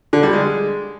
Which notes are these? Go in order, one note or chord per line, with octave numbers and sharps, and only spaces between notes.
D3
G3
G#3